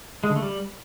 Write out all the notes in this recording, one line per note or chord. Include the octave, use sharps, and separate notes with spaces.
G#3
D3
A3
G3